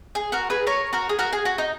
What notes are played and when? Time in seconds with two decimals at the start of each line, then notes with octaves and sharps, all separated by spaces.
0.15 G#4
0.32 F#4 A#4
0.50 G#4 B4
0.67 A#4 C#5
0.93 F#4 A#4
1.09 G#4
1.19 F#4 A#4
1.33 G#4
1.45 F#4
1.58 D#4